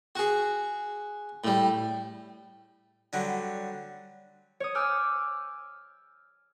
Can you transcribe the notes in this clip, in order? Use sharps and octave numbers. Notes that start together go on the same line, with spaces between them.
F#4 G#4
A2 G3
D3 F#3 G3
C#5 D#6
G#5 D6 E6 F6 G6